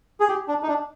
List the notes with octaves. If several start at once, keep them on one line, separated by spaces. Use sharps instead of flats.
G#4
G4
D4
D#4
D4